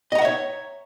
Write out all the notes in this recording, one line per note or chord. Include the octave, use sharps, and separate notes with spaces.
C#5 D#5 E5 F#5 A#5